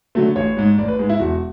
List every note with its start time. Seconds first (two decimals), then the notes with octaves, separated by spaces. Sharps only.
0.15 D3 F#3 A3
0.36 A1 C#5
0.57 G#2 G#3
0.78 A1 D5
0.88 B4
0.99 G#2 G#3
1.09 E4
1.20 E1 F#4